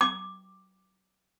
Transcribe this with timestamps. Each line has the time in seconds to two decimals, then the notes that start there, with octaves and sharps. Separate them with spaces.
0.01 D6